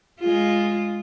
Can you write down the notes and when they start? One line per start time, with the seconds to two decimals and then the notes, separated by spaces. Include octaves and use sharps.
0.20 G#3 F4